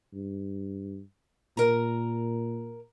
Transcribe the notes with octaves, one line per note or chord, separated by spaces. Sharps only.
G2
A#2 A#4 A#5